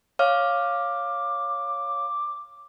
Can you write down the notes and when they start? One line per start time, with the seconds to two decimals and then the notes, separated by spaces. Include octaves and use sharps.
0.19 C#5 F5 D6 F6